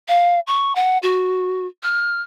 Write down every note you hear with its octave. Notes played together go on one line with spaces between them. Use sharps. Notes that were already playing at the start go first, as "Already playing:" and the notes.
F5
C#6
F#5
F#4
F6